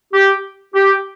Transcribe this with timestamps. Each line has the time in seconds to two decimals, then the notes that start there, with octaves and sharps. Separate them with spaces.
0.13 G4
0.75 G4